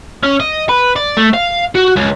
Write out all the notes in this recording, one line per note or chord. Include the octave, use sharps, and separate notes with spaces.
C#4
D#5
B4
D5
A3
F5
F#4
C#2